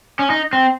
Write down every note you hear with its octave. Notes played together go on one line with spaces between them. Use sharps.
C#4
D#4
C4